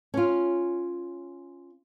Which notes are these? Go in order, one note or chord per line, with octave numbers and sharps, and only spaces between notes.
C#4 F4